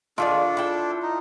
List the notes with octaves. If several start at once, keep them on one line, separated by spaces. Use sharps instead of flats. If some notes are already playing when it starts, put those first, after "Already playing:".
D#3 D4 F4 G#4 A4 D5
E4 G5
D#4